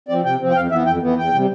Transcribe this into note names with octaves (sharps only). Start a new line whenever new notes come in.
F3 C4 D5
C3 G5
F3 C4
G5
F2 F5
E3 B3 E5
F2 G5
E3 B3
E2 G5
C3 G3